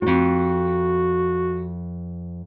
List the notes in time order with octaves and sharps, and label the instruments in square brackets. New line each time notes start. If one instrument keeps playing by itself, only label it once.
[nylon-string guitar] F2 G#2 [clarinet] F#4